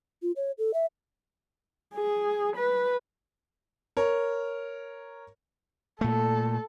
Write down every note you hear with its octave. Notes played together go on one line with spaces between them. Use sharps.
F4
C#5
A4
E5
G#4
B4
A#4 C#5
A#2 A3 A4